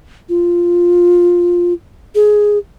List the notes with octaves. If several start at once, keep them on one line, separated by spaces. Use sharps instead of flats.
F4
G#4